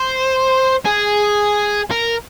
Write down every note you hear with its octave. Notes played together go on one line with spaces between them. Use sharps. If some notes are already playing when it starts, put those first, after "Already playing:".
Already playing: C5
G#4
A#4